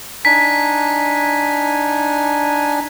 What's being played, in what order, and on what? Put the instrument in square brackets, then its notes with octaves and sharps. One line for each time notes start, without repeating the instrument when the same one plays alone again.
[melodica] D4 D#4 G#5 [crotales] B6